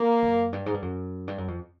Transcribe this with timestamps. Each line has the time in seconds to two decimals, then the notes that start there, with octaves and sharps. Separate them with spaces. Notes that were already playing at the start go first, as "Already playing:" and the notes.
Already playing: A#3
0.23 F#2
0.53 G2
0.66 G#2
0.74 G2
0.82 F#2
1.28 G2
1.38 F#2
1.48 F2